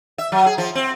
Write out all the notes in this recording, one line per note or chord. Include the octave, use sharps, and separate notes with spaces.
E5
F#3
G#4
F3
C4